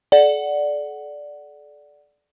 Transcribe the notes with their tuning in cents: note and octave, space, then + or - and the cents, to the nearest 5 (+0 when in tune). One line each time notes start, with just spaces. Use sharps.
A4 -40 D5 +0 F#5 +5